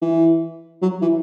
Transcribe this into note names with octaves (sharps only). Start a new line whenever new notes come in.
E3
F#3
E3